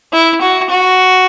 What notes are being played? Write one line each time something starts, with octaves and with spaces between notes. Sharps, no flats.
E4
F#4
F#4